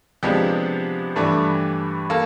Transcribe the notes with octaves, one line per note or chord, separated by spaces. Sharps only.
C3 F3 G#3 B3 D4 G4
G2 E3 A3 D4
A#3 A4